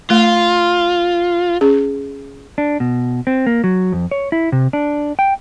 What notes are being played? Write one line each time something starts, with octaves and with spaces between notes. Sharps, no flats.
A3 F4
C#4 G#4
D4
B2
C4
A#3
F#3
F2
C#5
E4
C3
D4
G5